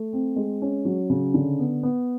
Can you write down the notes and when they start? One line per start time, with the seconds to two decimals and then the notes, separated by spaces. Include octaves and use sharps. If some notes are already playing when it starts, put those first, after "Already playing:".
Already playing: A3
0.13 C4
0.36 G#3
0.62 C#4
0.85 F#3
1.10 C#3
1.34 D3
1.59 B3
1.83 B3